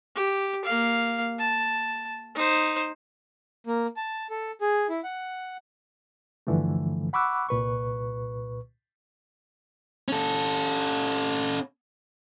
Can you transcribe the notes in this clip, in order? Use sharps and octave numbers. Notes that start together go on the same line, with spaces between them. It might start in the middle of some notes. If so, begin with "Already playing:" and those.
G4
A#3 F5
A5
D#4 C5
A#3
A5
A4
G#4
E4
F#5
G2 D3 E3 F3 A3
F#5 B5 C#6 D6 E6 F#6
C2 A#2 B4 C#6
C#4 A4